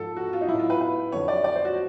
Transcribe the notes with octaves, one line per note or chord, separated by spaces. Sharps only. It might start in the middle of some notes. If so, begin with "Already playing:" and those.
Already playing: G#2 F3 A4
F#4
F4
D#4
A2 F#3 E4
F4
B4
B4
F2 D3 F#3 C#5
D5
D5
C5
F#4